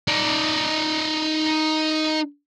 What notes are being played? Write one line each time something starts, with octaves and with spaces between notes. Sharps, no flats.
D#4 D5